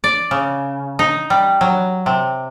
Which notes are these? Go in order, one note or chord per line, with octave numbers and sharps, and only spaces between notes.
D5
C#3
D#4
G3
F#3
C3